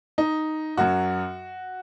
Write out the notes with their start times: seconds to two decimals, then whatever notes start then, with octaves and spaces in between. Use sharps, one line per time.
0.18 D#4
0.77 F#2 F#3 F#4